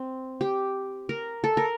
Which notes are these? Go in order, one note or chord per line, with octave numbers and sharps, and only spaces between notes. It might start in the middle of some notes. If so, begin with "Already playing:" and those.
Already playing: C4
G4
A#4
A4
A#4